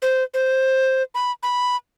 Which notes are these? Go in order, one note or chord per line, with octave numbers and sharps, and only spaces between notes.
C5
C5
B5
B5